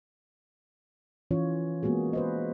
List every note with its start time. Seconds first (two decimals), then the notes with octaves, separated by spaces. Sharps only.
1.31 E3 C#4 F4 C#5
1.83 G#3 A#3 B3 F#4 G#4
2.13 B4 C5 D#5